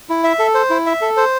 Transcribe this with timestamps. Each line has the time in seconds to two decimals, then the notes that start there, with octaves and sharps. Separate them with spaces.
0.09 E4
0.24 E5
0.39 A4
0.54 C5
0.70 E4
0.86 E5
1.01 A4
1.17 C5